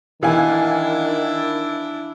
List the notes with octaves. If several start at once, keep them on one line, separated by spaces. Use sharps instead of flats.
D#3 E3 D4 E4 F5 G#5